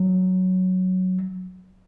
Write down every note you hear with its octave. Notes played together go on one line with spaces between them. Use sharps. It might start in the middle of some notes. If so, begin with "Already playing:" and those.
Already playing: F#3